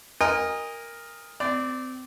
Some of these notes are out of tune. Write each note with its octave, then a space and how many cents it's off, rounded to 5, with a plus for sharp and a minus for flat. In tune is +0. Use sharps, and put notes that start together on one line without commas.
A#4 +0 D#5 +0 G#5 -40
C4 -30 D5 -5